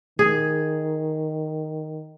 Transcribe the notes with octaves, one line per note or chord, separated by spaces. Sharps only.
D#3 G#4